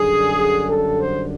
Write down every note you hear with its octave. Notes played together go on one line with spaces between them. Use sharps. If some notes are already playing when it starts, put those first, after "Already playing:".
Already playing: F#2 D3 G3 G#4
A4
C5